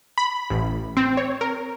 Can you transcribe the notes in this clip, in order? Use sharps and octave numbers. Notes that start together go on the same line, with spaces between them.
B5
A1
C4
C#5
A#4